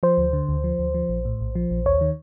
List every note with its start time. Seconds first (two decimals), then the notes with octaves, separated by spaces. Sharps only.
0.03 F3 C5
0.18 D2
0.33 D3
0.49 D2
0.64 F3
0.79 D2
0.94 F3
1.09 A#1
1.25 A2
1.41 A#1
1.55 F3
1.71 A#1
1.86 D#2 C#5
2.01 D#3